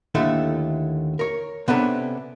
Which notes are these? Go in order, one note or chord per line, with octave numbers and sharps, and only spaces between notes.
D#2 D3 A3 E4
A#4 C#5
C3 B3 C#4 D4 A4 A#5